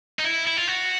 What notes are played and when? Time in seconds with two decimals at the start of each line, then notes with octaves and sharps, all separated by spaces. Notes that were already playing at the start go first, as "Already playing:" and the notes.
0.19 D#4
0.24 E4
0.47 E4
0.57 F4
0.67 F#4